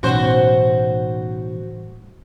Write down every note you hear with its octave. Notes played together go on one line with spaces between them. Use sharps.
B1 A2 E3 G3 C#4 F#4 B4 C5